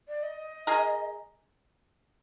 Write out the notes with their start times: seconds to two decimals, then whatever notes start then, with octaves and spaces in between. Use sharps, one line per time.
0.08 D5
0.23 D#5
0.67 G#4 A#4